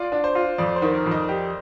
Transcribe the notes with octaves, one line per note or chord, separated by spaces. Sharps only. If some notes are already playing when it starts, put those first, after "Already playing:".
Already playing: F4 D5
D4
C5
F4
F2 D5
C5
D#3
A#4
F2
D#5
G4